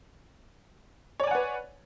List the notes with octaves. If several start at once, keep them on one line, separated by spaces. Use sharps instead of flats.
B4 C#5 D5 F#5 G#5